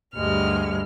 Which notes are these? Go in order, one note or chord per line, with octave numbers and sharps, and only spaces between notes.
D2 G2 G3 G#3 F6